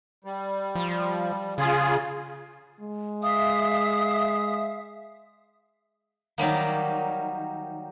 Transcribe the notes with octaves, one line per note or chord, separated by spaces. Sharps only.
G3
F3
C#3 F4 G#4
G#3
E5 F5 D#6
D#3 F#3 G3 A#3